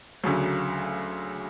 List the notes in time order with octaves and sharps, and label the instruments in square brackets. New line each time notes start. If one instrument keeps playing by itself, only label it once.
[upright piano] D2 C#3 F#3